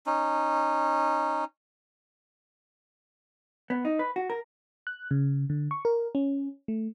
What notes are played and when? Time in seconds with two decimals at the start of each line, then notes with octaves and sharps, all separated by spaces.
0.06 C#4 D#4
3.70 B3
3.85 D#4
3.99 B4
4.16 F#4
4.30 A#4
4.87 F#6
5.11 C#3
5.50 D3
5.71 C#6
5.85 A#4
6.15 C#4
6.68 A3